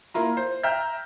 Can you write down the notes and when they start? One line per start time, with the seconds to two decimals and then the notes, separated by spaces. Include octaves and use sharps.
0.14 A#3 E4 F4 A#5
0.37 C5
0.63 E5 G5 A#5 F6 G6